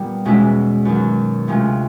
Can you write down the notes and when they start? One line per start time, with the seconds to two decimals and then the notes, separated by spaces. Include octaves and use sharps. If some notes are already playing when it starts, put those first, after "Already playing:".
Already playing: A#2 G3 B3
0.25 E2 B2 G#3 C#4 E4
0.85 F#2 D#3 F#3
1.48 D2 C3 F3 G#3 C#4